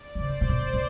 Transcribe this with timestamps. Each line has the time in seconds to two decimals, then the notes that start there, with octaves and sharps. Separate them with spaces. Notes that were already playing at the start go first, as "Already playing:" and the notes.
Already playing: D5
0.15 D3
0.19 C#3 C5
0.41 A#2
0.49 B2
0.73 A2